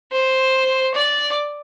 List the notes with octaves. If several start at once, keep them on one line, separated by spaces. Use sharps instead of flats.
C5
D5